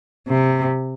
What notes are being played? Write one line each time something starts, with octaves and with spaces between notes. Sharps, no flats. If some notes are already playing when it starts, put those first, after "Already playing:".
C3